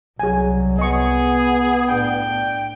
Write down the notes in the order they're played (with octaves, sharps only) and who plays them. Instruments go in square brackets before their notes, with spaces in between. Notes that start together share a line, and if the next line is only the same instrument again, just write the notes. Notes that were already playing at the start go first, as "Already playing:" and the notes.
[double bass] C2 [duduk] F#3 [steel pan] G#4 G#5
[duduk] B3 [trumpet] G#4 [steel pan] D#5 C#6
[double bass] A2 D4 [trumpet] G5